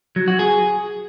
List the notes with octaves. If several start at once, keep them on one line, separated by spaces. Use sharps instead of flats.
F#3
F#4
G#4